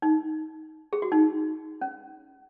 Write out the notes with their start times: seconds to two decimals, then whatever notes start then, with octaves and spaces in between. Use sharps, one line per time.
0.02 D#4
0.93 G#4
1.02 F#4
1.12 D#4
1.81 C#4